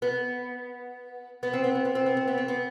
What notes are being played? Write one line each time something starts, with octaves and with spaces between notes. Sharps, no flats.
B3
B3
C4
B3
C4
B3
C4
B3
C4
B3
C4
B3